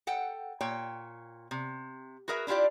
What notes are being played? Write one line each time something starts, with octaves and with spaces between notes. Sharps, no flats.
A4 F#5 G5
A#2 C#5 G5
C3
F#4 G#4 A#4 B4 E5
D4 E4 F4 G4 D5